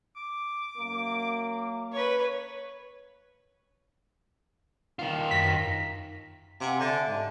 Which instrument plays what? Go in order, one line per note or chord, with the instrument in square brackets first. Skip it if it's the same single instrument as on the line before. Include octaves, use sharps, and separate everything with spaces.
[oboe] D6
[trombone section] F#2 A#3
[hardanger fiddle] B4 C#5
[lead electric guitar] D#3 F4
[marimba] F#2 A#6 [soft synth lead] B6
[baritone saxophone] C3 [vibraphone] F5 F#5 G#5
[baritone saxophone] D3 [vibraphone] E5 A5
[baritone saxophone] G#2